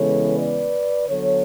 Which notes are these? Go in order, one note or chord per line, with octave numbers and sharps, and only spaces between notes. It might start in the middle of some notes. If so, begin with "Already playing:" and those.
Already playing: C#3 E3 G#3 B3 A4 C#5
B4 D5
D3 F#3 B3 A4 C#5